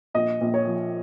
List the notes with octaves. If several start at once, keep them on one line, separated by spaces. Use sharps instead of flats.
A#1 D#5
A#1
C#5
F3